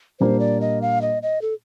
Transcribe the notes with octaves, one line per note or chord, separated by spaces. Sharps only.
A#2 G3 A#3 D4 C5
D5
D#5
F5
D#5
D#5
A4